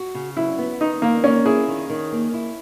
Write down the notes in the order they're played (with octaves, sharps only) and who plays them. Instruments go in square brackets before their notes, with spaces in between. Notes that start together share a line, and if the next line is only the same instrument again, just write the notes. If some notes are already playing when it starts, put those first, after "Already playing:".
Already playing: [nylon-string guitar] F#4
C#3
[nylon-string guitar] F#3 [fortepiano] E4
[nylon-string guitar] B3
[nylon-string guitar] D#3 [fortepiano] D#4
[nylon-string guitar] D#3 [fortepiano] A#3
[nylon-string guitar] A#3 [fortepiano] C#4
[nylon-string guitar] E4 [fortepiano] G#4
[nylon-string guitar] D#3
D#3
A#3
E4